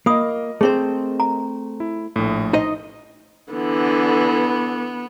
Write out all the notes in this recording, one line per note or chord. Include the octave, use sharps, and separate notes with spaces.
A#3 F4 A#4 D#5 D#6
A3 C4 G#4 C5
A#5
E4
A#1 A2
D#4 C5 D#5
D3 E3 B3